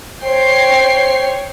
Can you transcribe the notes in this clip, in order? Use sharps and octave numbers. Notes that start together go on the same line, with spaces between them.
C5 C#5 G5 C7